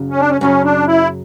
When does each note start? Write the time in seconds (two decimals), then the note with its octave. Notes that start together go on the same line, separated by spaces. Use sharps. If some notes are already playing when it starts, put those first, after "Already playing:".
Already playing: F#2 C#3 F#3
0.11 C#4
0.20 D4
0.31 C#4
0.41 F#2 C#3 F#3 C#4
0.65 D4
0.87 E4